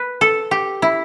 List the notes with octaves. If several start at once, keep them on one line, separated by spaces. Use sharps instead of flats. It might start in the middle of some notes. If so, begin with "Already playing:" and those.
Already playing: B4
A4
G4
E4